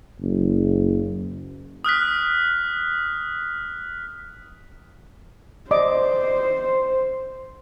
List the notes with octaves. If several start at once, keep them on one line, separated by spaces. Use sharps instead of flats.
F#1
D#6 F6 F#6 B6
C5 D5 D#5 D6